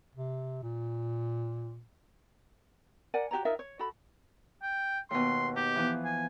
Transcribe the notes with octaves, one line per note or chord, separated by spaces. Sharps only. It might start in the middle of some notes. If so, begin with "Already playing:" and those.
C3
A#2
A#4 D5 F#5 G#5
F#4 G4 C#5 A#5
D#4 F4 A#4 E5
C#5
F#4 A4 B5
G5
D#2 B2 C6
D#4 G4
E3 F3 B3
G#5